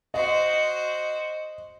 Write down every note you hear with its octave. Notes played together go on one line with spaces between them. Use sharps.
F#4 C5 D#5